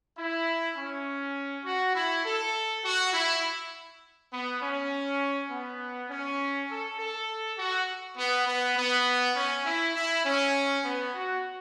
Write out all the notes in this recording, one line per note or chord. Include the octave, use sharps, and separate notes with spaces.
E4
C#4
F#4
E4
A4
F#4
E4
B3
C#4
B3
C#4
A4
A4
F#4
B3
B3
B3
C#4
E4
E4
C#4
B3
F#4